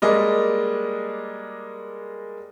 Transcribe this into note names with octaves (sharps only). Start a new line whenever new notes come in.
G3 G#3 A#3 D5 D#5